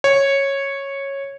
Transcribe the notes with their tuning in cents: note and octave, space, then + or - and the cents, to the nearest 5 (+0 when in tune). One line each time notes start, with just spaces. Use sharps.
C#5 -10